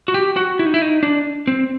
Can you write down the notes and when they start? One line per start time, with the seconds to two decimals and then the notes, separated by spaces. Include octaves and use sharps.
0.08 F#4
0.14 G4
0.36 F#4
0.59 E4
0.66 D#4
0.74 E4
0.82 D#4
1.03 D4
1.47 C4